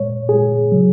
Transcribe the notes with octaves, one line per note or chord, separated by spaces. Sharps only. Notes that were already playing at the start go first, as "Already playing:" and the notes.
Already playing: A#2 G#3 C#5
A#2 G#3 G#4
C#3 F#3